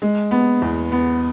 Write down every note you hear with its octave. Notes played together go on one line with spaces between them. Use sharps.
G#3
B3
E2
B3